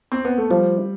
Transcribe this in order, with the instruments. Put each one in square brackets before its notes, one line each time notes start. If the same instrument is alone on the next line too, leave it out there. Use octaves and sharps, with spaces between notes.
[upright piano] C4
B3
A3
[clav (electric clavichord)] F3 [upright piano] G3